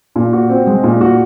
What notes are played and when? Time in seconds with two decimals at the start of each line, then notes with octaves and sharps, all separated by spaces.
0.16 A#2
0.33 F#4
0.49 C4
0.67 G#3
0.84 A#2
1.01 F#4